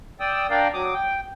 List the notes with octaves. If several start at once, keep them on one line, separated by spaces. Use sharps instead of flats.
D5 G5 D#6 E6
D4 A#4 D5 F5 G5
F#3 D6 D#6
G5